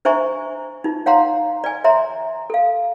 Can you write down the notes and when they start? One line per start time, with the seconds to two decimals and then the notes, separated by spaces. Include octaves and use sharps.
0.05 D4 C5 E5 G#5 A#5 C#6
0.84 D#4 F4
1.06 C#5 F5 F#5 A#5 C6
1.64 D5 G#5
1.84 C#5 E5 A#5 C6
2.50 A4 F5